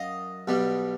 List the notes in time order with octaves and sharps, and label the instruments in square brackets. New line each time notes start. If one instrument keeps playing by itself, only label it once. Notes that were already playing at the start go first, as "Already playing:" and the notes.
Already playing: [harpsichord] F#2 F#3 D#5 F5
B1 B2 G3